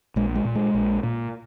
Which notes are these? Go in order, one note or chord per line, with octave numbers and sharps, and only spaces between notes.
A#1 G#3
G#3
A#2
G#3
A#1
A#2